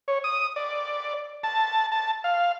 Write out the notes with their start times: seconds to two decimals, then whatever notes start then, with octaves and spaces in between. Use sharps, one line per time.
0.08 C#5
0.24 D#6
0.56 D5
1.43 A5
1.92 A5
2.24 F5